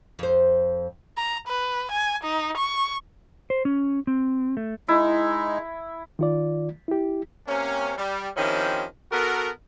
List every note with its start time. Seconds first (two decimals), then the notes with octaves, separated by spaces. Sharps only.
0.19 F2 C5
1.18 A#5
1.48 B4
1.91 G#5
2.23 D#4
2.57 C#6
3.50 C5
3.65 C#4
4.07 C4
4.57 A3
4.88 G#3 D#4 E4
6.19 D#3 F4 D5
6.88 E4 G4
7.47 C3 A#3 C4 C#4
7.98 G3
8.37 D#3 F3 C4 C#4 E4 G4
9.12 B3 F#4 A4 A#4